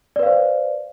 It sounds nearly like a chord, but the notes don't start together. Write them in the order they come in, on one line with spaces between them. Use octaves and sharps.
D5 B4 F5 C5